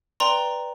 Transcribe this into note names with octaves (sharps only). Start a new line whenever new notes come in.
B4 D5 G5 A#5 C6